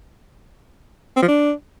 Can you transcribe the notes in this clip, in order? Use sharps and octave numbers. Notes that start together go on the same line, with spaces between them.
C4
F3
D4